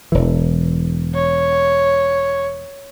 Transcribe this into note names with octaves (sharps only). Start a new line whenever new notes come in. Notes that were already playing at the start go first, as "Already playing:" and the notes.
E1 E3
C#5